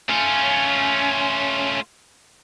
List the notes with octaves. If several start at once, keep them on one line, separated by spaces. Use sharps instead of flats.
A3 C#4 F4